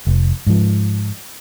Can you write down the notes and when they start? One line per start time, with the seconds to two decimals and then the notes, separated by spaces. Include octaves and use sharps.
0.07 F1
0.47 G#2 F3